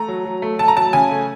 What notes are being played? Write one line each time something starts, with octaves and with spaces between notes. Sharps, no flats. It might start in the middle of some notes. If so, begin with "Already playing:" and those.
Already playing: A3 A#5
F#3
F#3
A3
A3 A5
A#5
F#3 A5
C#3 G#5
A3